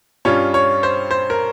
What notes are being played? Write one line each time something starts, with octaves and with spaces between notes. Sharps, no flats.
G2 G3 C#4 F4 C#5
C#5
C5
C5
A#4